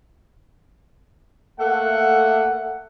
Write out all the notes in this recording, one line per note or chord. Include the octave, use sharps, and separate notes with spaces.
A3 A#3 A4 F#5